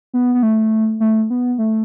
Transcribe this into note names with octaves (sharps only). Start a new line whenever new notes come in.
B3
B3
A3
A3
B3
A3